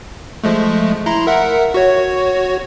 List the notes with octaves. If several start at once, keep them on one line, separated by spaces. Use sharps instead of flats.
F3 G#3 A3
E4 A#5 C6
A#4 E5 F#5
F#4 C#5